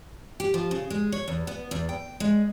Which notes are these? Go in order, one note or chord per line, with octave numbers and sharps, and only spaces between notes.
G4
F3
C#3
G#3
C#5
E2
B3
E2
G5
G#3